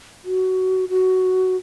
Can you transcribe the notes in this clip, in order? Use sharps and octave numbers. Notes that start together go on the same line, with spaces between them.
F#4
F#4